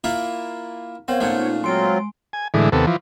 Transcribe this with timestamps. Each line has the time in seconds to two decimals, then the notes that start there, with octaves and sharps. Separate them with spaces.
0.04 A#3 E4 F4
1.08 B3 C4 A#4 C5 C#5 F5 G5
1.20 A#2 A3 C#4 D#4 F4 C#5 F5
1.64 F#3 G#3 C4 F4 C6 D7
2.33 G#5
2.54 A2 D3 E3 G#3
2.72 D#2 C3 B3 A4
2.87 E3 F3